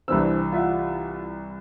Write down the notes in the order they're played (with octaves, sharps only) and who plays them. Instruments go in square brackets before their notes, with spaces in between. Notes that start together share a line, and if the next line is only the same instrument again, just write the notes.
[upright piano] C2 E3 E6 [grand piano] C4 D4 B4
[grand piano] F4 E5 F#5